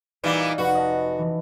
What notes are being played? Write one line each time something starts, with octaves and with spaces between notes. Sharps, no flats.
A#2 E3 G3 D#4 D5 F5
F1 C#4 F#4 B4
D#5 A5
E3